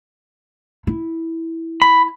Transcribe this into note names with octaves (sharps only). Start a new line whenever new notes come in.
E4
B5